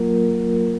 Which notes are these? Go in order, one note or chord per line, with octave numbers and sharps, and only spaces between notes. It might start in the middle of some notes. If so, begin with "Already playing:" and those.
Already playing: F#3 A#3 F4 A#4